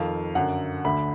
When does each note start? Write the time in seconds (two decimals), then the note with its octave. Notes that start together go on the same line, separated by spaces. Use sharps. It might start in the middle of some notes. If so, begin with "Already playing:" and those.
Already playing: F2 D#3 F5
0.35 F#2 D3 F#5
0.84 D2 D3 B5